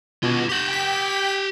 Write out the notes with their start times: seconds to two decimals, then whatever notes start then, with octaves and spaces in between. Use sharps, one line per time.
0.23 B2 F4 G#4
0.49 G4 F#5 G6
0.68 G5 B6